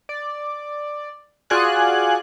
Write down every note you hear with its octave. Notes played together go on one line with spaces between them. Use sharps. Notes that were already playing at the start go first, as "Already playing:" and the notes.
D5
F4 F#4 G#4 D5 G#5 F#6